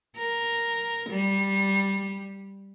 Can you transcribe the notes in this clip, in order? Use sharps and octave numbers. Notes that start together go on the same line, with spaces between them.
A#4
G3